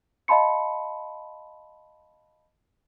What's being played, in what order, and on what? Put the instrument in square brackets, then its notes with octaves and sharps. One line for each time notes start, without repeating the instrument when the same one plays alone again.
[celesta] D#5 F5 A5 B5 C6 C#7